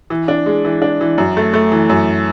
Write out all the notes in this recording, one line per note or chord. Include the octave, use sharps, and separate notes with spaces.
E3
D4
G#3
E3
D4
E3
F#2
A3
A3
E3
F#2